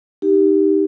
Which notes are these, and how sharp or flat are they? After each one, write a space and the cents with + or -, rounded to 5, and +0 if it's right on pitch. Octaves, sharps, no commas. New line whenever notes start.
D#4 +0 G4 +0